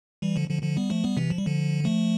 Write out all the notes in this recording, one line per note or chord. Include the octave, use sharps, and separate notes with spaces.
E3 G3
D3 F3
D3 F3
D3 F3
G3 B3
F3 A3
G3 B3
C3 E3
F3
G3
D3 F3
F3 A3